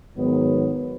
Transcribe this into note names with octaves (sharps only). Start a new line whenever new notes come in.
G#2 D#3 F#3 B3